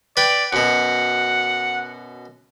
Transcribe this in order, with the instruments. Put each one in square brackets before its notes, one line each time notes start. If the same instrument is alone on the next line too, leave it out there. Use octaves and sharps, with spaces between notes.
[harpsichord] B4 G5 [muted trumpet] D5
[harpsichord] F#2 B2 [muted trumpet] F#5